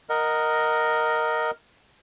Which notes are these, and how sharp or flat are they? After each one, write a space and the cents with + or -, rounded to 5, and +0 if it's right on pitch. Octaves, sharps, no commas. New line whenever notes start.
A#4 +0 D#5 +0 F#5 +0